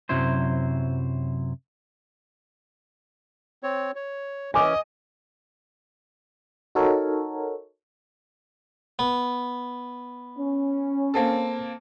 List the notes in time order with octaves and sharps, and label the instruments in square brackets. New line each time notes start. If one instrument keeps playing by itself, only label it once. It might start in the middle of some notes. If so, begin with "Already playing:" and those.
[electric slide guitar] F#2 C3 F#3 E4 C5
[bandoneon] C4 C#5
C#5
[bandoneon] E3 C#4 [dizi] D#5 [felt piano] G#5 D6
[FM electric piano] D#4 F#4 A4 A#4 C#5
[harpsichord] B3
[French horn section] C#4
[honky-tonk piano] A#3 C4 A4